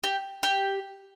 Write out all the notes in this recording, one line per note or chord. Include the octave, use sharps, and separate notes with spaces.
G4
G4